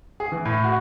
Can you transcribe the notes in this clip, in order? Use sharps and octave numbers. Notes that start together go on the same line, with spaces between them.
G#4
E3
A2
F#4